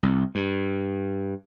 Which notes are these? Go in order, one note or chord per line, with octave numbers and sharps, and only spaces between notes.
C2
G2